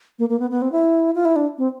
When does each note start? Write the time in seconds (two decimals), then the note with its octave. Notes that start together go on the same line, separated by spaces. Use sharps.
0.19 A#3
0.29 A#3
0.40 B3
0.51 B3
0.62 C4
0.72 E4
1.15 F4
1.25 E4
1.36 D4
1.58 C4